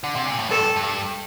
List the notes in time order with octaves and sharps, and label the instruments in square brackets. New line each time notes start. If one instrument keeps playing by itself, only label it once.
[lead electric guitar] D3
C3
A#2
A2
[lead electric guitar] G2 [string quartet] A4
[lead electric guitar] G2